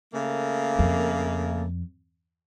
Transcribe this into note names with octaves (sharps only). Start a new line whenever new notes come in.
C#3 A3 A#3
F2